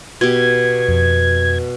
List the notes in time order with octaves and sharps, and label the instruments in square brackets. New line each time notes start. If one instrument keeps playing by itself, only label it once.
[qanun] B2 G4 [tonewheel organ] G#6
[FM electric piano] F2